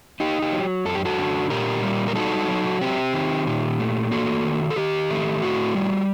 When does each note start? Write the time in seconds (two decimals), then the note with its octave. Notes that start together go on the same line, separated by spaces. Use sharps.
0.20 D#4 G4
0.42 G4
0.52 F#3
0.85 F#2 A4
0.95 G4
1.05 F#4 A4
1.18 D3
1.50 A#2 G4 A#4
1.83 G3
2.08 A#4
2.15 D#4 F#4 A4
2.48 F#3
2.81 C4 G4
3.13 D#3
3.47 A#2 G4
3.80 A3
4.11 A#3 F#4 A4
4.45 D#3
4.70 A4
4.76 D#3 G4
5.10 A3
5.42 A2 F#4
5.75 G3